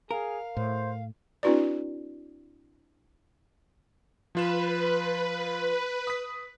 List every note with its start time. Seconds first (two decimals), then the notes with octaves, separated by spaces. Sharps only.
0.11 G#4 A#4 F5
0.57 A2 C5
1.43 C4 D4 E4 F#4 B4 D5
4.35 F3 F4 B4 E7
6.07 D#6 B6